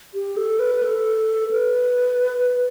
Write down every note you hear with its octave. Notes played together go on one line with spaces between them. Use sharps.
G4
A4
B4
A4
B4